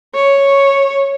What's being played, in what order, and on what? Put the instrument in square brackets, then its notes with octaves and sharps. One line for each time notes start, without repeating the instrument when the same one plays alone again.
[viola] C#5